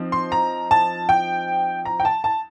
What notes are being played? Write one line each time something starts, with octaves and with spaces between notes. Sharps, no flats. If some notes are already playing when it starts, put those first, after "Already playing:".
Already playing: F3 C4 D#4
C6
A#5
A5
G5
A#5
G5
A5
A5